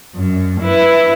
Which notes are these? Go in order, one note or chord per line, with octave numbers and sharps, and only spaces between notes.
F#2
E4 B4